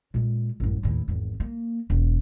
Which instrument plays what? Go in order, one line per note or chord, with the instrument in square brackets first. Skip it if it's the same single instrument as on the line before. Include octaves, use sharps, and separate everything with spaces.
[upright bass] A#2 G#3
A1 F#2
D#2 A2
G#1 E2
A#3
E1